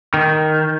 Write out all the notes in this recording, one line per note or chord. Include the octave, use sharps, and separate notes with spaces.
D#3